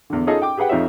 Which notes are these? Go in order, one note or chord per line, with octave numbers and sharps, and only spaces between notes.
E2 D3
C#4 D#4 F4 G#4 A4 D#5
G5 D6
G4 G#4 B4 F#5 G5
F2 D#4 F4 C#5 E5